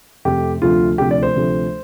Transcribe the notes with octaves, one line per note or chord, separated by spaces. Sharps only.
F2 C3 A3 G4
D2 C3 F3 A3 F4
D2 C3 F3 A3 G4
D5
C5
D2 C3 F3 A3